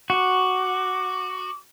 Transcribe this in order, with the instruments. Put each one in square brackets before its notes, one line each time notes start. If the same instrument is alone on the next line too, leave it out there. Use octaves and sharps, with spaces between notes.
[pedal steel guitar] F#4 [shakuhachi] D6